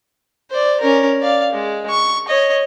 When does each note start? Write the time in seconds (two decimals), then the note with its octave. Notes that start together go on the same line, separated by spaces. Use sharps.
0.50 C5 D5
0.81 C#4 A#4
1.21 D5 F5
1.52 G#3
1.90 C#6
2.27 C#5 D#5